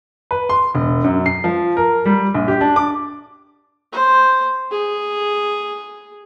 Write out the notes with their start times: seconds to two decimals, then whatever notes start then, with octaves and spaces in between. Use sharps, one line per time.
0.31 B4
0.49 C6
0.74 E1
1.04 F#2
1.26 C7
1.44 F3
1.77 A#4
2.06 G3
2.34 A#1
2.48 G4
2.61 D4
2.76 D6
3.93 C5
4.71 G#4